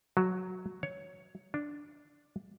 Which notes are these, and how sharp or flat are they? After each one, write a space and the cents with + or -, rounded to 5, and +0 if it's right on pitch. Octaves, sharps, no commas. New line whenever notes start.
F#3 +0
C#5 +10
D4 +0